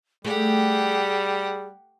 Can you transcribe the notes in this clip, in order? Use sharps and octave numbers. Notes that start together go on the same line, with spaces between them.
G3 A3 G4 G#4 F#5